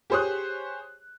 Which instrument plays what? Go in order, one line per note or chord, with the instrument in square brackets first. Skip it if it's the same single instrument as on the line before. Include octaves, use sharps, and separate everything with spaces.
[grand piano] G4 G#4 C5 C#5 D#6 F#6